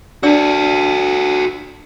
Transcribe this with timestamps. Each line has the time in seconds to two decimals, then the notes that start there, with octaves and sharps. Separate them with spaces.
0.23 D4 F#4 A4 D5 E6